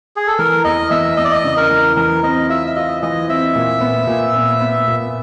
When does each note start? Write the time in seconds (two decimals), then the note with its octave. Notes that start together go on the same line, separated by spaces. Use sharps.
0.16 G#4
0.27 A4
0.38 E3 A#4
0.64 E2 D#5
0.91 E2 E5
1.17 E2 D#5
1.25 D5
1.32 D#5
1.44 C#3
1.57 A#4
1.70 E3
1.96 E3 A#4
2.23 C4 D#5
2.49 F4 E5
2.67 E5
2.76 F4 D#5
3.02 E3 D#5
3.28 C4 E5
3.55 A#2
3.81 B3
4.07 A#2
4.35 B3
4.60 B3
4.88 A#2